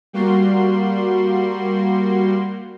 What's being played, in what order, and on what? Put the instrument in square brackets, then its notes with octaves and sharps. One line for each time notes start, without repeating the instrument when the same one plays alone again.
[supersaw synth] G3 A#3 F#4 C6